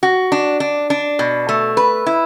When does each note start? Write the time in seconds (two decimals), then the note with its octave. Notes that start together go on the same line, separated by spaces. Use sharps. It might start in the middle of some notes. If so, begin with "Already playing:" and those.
0.03 F#4
0.32 D4
0.60 D4
0.90 D4
1.19 B2
1.49 A3
1.77 B4
2.06 E4